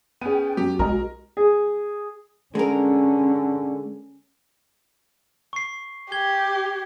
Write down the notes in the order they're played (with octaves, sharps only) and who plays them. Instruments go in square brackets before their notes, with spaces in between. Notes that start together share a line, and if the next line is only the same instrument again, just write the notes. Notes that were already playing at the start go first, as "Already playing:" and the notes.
[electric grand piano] B3 C#4 [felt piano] G#4 D#7 [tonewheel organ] G5
[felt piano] F#2 [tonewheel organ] F#4 [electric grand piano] G4
[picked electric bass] B1 E3 G#3 [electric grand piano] A#4 [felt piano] D#5 A#5
[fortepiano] G#4
[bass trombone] D3 [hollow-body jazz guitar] G#3 A#4 [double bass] C#4
[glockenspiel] C#6 C7
[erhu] G4 [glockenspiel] G#6 G7